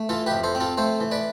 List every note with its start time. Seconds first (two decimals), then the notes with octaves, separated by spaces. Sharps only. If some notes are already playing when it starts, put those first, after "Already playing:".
Already playing: A3
0.09 E3 F4 A4
0.26 G4 B4
0.32 F2
0.44 A4 C5
0.55 C4
0.60 F4 A4
0.77 A3 A4 C5
1.00 E3
1.11 B4 D5